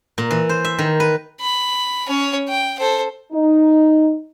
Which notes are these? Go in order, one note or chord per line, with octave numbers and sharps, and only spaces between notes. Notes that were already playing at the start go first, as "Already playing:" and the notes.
A#2
E3
C5
E5
D#3
B4
B5
C#4 C#5
G5
A4 C5
D#4